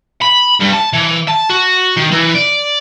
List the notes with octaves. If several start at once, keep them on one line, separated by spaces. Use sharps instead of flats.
B5
G2
A5
E3
A5
F#4
D#3
E3
D5